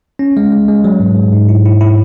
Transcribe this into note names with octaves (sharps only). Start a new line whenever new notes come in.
C#4
G#3
G#3
G#3
F#3
G#2
F#3
G#2
E4
E4
E4